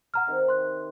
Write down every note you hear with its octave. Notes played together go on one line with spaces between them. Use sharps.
F#5 A#5 F6
C3 D#3
C6 F#6